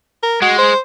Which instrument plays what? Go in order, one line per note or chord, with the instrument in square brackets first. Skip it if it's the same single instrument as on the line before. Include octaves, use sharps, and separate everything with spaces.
[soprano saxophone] A#4
[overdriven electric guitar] G#3 [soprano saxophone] F#4
[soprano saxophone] C5